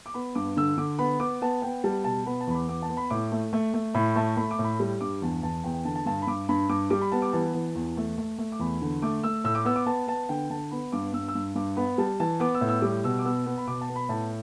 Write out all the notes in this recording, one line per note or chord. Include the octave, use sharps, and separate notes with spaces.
D6
B3 B5
G2 D6
D3 E6
D3 D6
B3 B5
B3 D6
B3 A5
B3 G5
G3 A5
B2 A5
B3 B5
A5
E2 B5
D6
B3 D6
A5
B3
B5
A2 D6
A3
A3
A3
A2 B5
A3 A5
A3 B5
D6
A2
B5
G3
G2 D6
E2 A5
E2 A5
E2 G5
G5
D3 A5
A5
G2 A5
B5
G2 D6
G2 B5
G2 D6
G3 D6
B5
B3 A5
D6
E3 A5
E3
E2
A3
A3
A3
D6
E2 B5
D3
A3 D6
A3 E6
A2 E6
D6
B3 E6
D6
B3 A5
B3 A5
D3 G5
D3 A5
B3 B5
G2 D6
G2 E6
E6
G2
G2 D6
B3 B5
G3 A5
E3 A5
B3 D6
E6
A2
E6
G3 D6
B2 E6
D6
B3 E6
B3
B5
B2 D6
A5
B3
B5
A2 A5